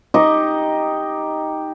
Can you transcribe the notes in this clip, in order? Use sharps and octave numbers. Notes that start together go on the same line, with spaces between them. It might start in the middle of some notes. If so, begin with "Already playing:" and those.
D#4 G4 D#5 C#6